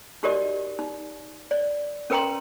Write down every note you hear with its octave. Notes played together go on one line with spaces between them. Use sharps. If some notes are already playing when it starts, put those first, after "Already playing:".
D#4 F#4 G4 A#4 D5 D#5
D#4
D5
C#4 A#4 B4 G5 A#5 C6